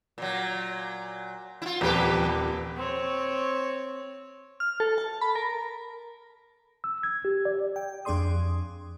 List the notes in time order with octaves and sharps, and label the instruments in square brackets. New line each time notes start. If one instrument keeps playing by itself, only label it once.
[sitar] A#2 F#3
E4 F4
[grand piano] D#1 [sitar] E2 G4 B4
[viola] C4 C#5
[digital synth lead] F6
A4
A5
B5
A#4
[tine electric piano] E6
G#6
G4
D5
[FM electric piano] G5
F2 D4 G#4 D5 C6 D#6